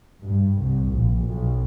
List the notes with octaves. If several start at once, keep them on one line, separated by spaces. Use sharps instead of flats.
G2
C2
A#1
B1